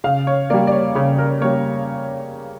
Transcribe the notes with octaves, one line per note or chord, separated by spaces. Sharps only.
C#3 F5
C#5
G3 A#3 D5
D5
C#5
C#3 C#5
A#4
G3 A#3 C#5